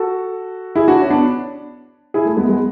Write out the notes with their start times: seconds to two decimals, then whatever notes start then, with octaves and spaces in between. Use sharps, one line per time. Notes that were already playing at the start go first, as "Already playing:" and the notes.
Already playing: F#4 A4
0.76 E4 G#4
0.88 D4 F#4
1.02 C#4
1.10 B3 D4
2.14 E4 G#4
2.25 A3
2.37 G#3 B3
2.48 G#3 B3